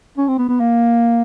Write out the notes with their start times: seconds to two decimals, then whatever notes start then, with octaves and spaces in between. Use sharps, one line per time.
0.17 C#4
0.28 C4
0.38 B3
0.48 B3
0.60 A#3